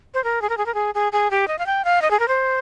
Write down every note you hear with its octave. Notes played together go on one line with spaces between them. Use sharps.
C5
A#4
G#4
A#4
G#4
A#4
G#4
G#4
G#4
G4
D#5
F5
G5
F5
D#5
G#4
A#4
C5